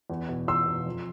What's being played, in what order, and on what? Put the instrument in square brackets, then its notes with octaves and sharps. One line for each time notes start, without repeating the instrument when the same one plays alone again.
[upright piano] E2
B2
E2 C6 E6
B2
F2